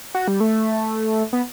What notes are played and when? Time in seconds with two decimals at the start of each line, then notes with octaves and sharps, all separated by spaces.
0.15 F#4
0.28 G3
0.40 A3
1.33 B3